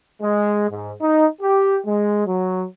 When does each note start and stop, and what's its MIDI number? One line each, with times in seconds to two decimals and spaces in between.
0.22 0.67 56
0.70 0.92 44
1.01 1.26 63
1.41 1.78 67
1.86 2.23 56
2.26 2.66 54